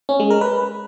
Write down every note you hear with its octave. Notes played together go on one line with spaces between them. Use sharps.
C#4
G#3
A#4
B4